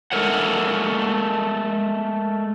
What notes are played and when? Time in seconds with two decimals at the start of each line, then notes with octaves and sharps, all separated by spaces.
0.12 G#3 A3 A4 A#4 C#5 F#5